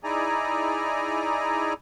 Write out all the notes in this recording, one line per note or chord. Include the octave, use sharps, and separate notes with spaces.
D#4 E4 G#4 D5 G#5 A#5